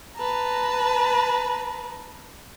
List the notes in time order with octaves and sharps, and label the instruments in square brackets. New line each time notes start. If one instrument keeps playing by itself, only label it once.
[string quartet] B4 A5 A#5